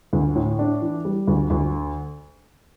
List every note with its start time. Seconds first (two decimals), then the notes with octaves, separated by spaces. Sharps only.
0.13 D2
0.35 A2
0.59 D4
0.82 E3
1.05 G3
1.27 D2
1.50 D2